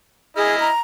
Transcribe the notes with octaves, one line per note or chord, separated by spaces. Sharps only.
E4 G#4 D#5 F6
A#5